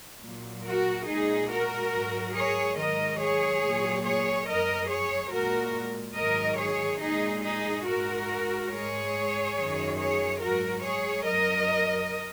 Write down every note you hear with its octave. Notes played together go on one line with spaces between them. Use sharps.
A#2 F#3
F#4 A#4
A#2 G#3 D#4 G#4
F#4 A#4
G#2 F#3
G#4 C#5
G#2 D#3 F#3 A#4 D#5
G#4 C#5
A#2 F#3
G#4 C#5
F#2 F#3 A#4 D#5
G#4 C#5
A#2 G#3 F#4 A#4
G#2 D#3 F#3 A#4 D#5
G#4 C#5
A#2 G#3 D#4 G#4
D#4 G#4
G#2 G#3 F#4 A#4
G#2 G#3 G#4 C#5
F#2 D#3 F#3
G#4 C#5
G#2 F#3 F#4 A#4
G#4 C#5
F#2 F#3 A#4 D#5